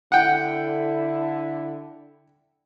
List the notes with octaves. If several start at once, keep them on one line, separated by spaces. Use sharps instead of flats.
D3 E4 F#5 G5